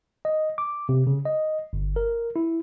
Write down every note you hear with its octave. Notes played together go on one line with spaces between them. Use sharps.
D#5
D6
C3
C#3
D#5
G1
A#4
E4